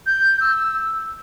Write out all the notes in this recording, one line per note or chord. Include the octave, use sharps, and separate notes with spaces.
G6
E6